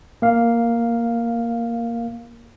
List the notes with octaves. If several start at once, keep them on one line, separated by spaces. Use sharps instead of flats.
A#3 F5